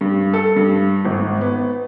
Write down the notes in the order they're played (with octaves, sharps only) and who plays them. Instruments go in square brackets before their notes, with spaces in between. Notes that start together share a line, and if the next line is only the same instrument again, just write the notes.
[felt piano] G2
A4
G2
G#1
B3